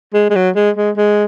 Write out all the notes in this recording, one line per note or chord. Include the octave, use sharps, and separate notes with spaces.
G#3
G#3
F#3
G#3
G#3
G#3